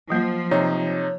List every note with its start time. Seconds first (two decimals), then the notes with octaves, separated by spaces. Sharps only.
0.10 F3 F#3 A#3
0.51 C3 D#4 C#5